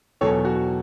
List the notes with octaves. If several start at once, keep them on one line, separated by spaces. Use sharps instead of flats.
E2 B2 F#3 A4 C#5
F#4